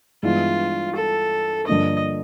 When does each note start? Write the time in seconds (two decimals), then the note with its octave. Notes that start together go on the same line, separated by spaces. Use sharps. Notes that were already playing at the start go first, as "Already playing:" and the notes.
0.23 G2 E3 G#3 B3 D4 F4
0.95 A4
1.67 G2 D3 F3 A#3 D4 D#5